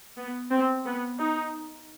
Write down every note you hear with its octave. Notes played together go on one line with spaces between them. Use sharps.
B3
C4
B3
D#4